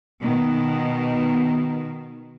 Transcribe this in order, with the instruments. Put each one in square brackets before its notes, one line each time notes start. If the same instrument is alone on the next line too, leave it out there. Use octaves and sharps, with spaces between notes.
[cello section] B2 D#3